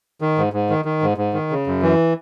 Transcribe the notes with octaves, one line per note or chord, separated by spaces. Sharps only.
D#3
G#2
G#2
D#3
D#3
G#2
G#2
D#3
C#3
F#2
E3